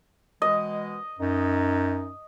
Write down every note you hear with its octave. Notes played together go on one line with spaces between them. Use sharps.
B2 E3 G#3 D#5
F#2 D#4